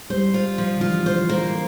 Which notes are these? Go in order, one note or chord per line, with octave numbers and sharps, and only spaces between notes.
G3 C5
F4
F3
D3
E3 F4
C5
D3
A#3